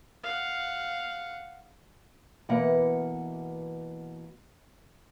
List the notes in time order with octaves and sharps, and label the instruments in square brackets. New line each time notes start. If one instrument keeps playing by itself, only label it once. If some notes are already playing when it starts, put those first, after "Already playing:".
[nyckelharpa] F5 F#5
[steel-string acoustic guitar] B2 E3 A#3 F#5